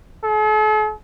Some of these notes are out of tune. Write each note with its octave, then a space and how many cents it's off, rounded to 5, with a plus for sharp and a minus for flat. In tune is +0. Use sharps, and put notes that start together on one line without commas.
A4 -45